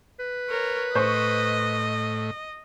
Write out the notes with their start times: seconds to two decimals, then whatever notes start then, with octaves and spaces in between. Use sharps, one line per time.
0.19 B4
0.49 A#4 C#5
0.95 A2 C5 D#5 C#6